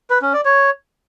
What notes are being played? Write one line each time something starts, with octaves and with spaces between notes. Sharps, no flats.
B4
C#4
D5
C#5